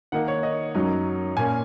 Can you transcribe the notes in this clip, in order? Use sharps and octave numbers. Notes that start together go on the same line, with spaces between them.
D#3 A#3 D#4 F#5
C#5
D#5
F#2 F#3 D#4
A#2 A#3 C#4 G#5